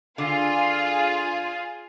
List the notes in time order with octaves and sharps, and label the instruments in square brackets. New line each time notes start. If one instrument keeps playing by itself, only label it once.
[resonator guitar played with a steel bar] D3 [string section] F4 G#4